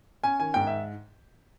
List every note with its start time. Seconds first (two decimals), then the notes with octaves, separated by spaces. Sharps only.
0.24 C#4 G#5
0.40 D#3 G#5
0.54 G#2 G5
0.67 E5